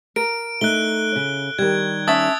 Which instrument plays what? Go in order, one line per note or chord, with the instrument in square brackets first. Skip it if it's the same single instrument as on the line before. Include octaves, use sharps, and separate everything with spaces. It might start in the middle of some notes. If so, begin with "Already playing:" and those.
[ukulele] A#4 [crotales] D7
[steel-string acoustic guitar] A3 D#4 [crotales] F#6 G7
[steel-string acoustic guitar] C#3
[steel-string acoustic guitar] D#3 G3 [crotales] G#6
[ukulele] C#4 E5 A5 [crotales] D#6 E6 A6